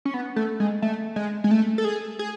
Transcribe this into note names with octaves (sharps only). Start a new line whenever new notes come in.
C#4
B3
A3
G#3
A3
G#3
G#3
A3
A4
G#4
G#4